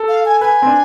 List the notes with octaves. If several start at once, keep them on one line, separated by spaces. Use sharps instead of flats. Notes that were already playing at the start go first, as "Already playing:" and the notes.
Already playing: A4
F5
G#5
B4 G#5
C4
D4